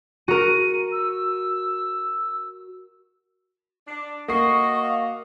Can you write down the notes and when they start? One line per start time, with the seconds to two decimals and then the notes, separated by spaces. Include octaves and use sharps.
0.28 F#4 A#4 D#7
0.92 E6
3.87 D4
4.28 A#3 F#4 D#5 C#6 C7
4.81 F5